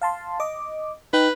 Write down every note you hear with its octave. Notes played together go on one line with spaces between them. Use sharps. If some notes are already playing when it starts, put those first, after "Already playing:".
F5 A5 C6
D#5 D6
D#4 B4 G5